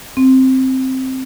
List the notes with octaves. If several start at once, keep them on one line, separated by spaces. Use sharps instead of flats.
C4